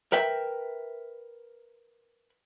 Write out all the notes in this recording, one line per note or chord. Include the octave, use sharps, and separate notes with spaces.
A#4 B4 E5 G5